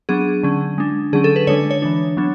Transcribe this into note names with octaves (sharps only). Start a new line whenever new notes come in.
F#3 B3 D4 G#4
D3 F#3 C#4
G#3 D4
D3 F#3 C#4 G#4
A4
B4
D3 G#3 D4 C#5
C#5
E3 G#3 D4
F#3 B3 D4